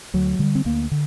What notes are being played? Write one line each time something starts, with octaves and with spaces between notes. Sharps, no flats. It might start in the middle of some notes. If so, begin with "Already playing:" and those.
D2 F#3
D3 G3
C4
D2 A#3
D3